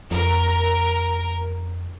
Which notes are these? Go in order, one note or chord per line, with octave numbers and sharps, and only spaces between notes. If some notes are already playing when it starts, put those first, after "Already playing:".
F2 A#4